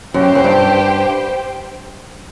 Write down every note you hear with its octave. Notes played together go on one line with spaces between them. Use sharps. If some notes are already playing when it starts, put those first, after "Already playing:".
F#2 G4 C5 G5
F#2
G2